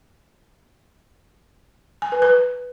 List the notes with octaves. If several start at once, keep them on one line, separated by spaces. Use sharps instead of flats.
G#5
B4
B4